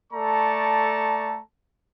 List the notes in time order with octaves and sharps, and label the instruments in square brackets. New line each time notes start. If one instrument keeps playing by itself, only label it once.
[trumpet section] A3 A4 D5 A5 A#5 C#6